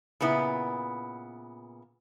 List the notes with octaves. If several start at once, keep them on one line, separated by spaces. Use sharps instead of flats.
A#2 C#3 B3 E4